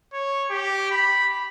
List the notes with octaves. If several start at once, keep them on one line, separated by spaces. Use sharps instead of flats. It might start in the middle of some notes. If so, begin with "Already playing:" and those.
C#5
G4
B5